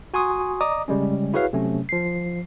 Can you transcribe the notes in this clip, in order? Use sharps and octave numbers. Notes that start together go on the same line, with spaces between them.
F#4 G#5 C6 C#6 D#6
D5 D#5 A#5 D6 D#6
C#3 G3 G#3 C#4
E4 F#4 G#4 B4 C#5 F5
C3 F#3 A3 C#4
F3 C7